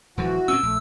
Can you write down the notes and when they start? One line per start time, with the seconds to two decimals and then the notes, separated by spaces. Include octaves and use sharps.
0.17 D#1 E3 F3 F#4
0.48 A#2 C4 C#4 E6
0.63 A#1 A3